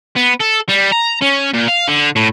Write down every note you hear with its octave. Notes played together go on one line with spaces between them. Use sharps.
B3
A4
G3
A#5
C#4
A#2
F5
D3
A2